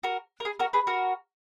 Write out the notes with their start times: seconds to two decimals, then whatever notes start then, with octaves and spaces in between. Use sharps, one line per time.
0.03 F#4 A#4
0.40 A#4
0.45 G#4
0.59 F#4 A#4
0.73 G#4 B4
0.87 F#4 A#4